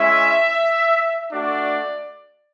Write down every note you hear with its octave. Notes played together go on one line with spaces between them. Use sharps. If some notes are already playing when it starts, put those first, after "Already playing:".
Already playing: G#3 C#4 E4 E5
A3 D4 F#4 D5